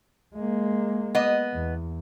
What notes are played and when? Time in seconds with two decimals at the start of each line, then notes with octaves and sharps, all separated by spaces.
0.35 G#3 A#3
1.15 B3 D#5
1.54 E2